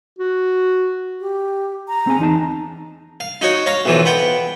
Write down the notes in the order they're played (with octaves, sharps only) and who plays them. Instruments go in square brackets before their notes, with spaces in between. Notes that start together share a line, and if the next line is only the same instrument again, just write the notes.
[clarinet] F#4
[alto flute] G4
A#5
[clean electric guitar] C4 G#4 G#5
E2 D#4 A5
[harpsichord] F5
D#4 F#4 C#5
C#5 F5 A#5
B1 E3 F3
B3 F#5 G5